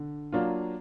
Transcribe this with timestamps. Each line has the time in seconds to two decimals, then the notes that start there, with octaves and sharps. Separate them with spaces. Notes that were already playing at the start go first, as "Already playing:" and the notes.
Already playing: D3
0.32 F#3 A#3 D4 F4